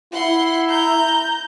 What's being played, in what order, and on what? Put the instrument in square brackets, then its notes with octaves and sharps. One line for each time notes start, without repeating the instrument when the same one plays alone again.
[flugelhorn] E4 [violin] F#5 C6
[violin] A#5 G6